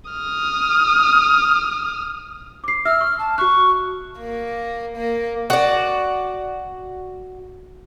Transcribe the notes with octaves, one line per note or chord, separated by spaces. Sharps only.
D#6 F6
D6 C7
E5 E6 F6
C#6
A5
F#4 C#6 F#6
A#3
A#3
F#4 D5